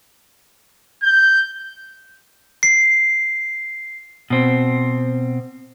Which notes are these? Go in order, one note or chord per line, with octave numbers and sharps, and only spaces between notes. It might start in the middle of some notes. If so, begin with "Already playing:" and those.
G6
C7
B2 C4